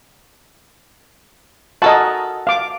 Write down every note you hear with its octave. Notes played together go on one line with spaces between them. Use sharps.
F#4 A4 A#4 D#5 G#5 A5
F5 D6